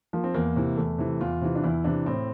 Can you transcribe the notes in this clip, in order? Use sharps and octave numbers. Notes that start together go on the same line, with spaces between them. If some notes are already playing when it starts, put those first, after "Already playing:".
F3 A#3
C4
E2 A#3
C3 E3
E2 A3
C3 E3
E2 F4
C3 E3
D4
E2 E4
C3 E3 D4
A2 C4